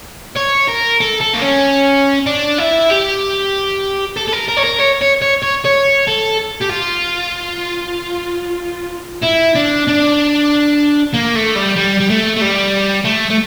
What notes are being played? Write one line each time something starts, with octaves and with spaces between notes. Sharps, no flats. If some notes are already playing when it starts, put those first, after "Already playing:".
C#5
A#4
A4
A4
A#3
C#4
D4
E4
G4
A4
A4
A#4
A#4
C#5
A#4
C#5
C#5
C#5
C#5
C#5
A4
G4
F4
E4
D4
D4
A#3
A3
G3
G3
G3
A3
A3
G3
A3
A3